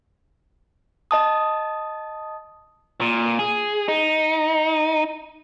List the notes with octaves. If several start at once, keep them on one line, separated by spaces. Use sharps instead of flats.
D#5 A5 D#6
A#2
G#4
D#4